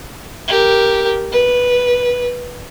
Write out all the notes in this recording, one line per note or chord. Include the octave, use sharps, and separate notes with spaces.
G4 A#4
B4